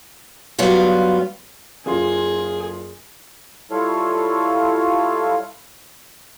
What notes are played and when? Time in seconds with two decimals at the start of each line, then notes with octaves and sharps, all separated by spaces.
0.58 G2 F#3 G3 B3 F4
1.86 F#1 F4 G#4 C6
3.71 G3 E4 F4 A4 C#5 F5